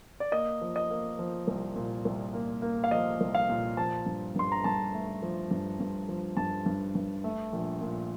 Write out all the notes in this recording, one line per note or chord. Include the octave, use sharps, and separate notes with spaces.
D5
A#3 D#5
F3
D#5
A#3
F3
C2
A#2
C2
A#3
A#3
F5
F3 D#5
C2
F5
A#2
F3 A5
G2
G2 C6
A#5
G2 A5
A3
F3
G2
G2
F3
G2 A5
G2
G2
A3
A#1
A#2